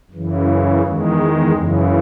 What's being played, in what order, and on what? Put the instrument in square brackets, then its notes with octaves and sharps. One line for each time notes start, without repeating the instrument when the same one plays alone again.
[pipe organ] F#2 C#3 E3
E2 D#3 G#3
F#2 C#3 E3